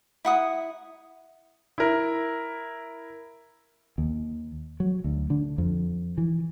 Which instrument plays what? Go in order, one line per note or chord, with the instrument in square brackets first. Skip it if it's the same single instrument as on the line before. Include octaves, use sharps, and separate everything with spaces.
[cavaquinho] E4 F#5 D#6
[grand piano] E4 A#4
[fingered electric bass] D#2
F#3
D2
D3
F2
E3